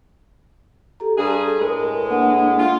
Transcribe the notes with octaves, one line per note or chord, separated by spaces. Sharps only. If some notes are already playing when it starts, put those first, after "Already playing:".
G4 A4 A#5
G2 G#4
A2 G#3 A#4 B4
A#3 D4 F#5
F4